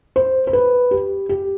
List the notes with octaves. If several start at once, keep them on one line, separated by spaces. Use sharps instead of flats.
C5
C5
B4
G4
G4